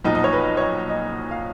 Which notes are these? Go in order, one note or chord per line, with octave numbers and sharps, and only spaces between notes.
B1 A#2 F3 D#4
D#5
C#5
B4
C#5
D#5
D#5
F5